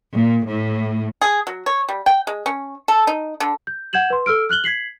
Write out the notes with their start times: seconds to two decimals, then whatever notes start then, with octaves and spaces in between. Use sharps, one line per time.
0.15 A#2
0.47 A2
1.21 G#4
1.47 F#3
1.66 C#5
1.89 G3
2.06 G5
2.27 G#3
2.46 C#4
2.88 A4
3.07 D#4
3.40 D3
3.67 G6
3.93 F#5 G6 G#6 E7 F#7
4.10 B4 C6
4.26 A4 E6 F6 D7
4.49 F6 F#6 F#7 G7
4.64 G#6 B6 C7 F#7